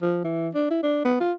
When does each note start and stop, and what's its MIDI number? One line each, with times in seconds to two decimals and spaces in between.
0.02 0.19 53
0.24 0.49 52
0.54 0.65 62
0.70 0.80 64
0.83 1.02 62
1.05 1.18 59
1.20 1.32 65